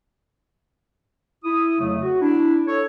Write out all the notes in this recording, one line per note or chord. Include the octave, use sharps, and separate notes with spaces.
E4 D#6
F2 C#3 F#3 A3
F#4
D4 E4
A4 C#5